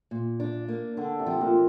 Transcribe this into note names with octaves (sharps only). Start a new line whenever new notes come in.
A#2
D4
A#3
D3 D4
C3
F3
A#2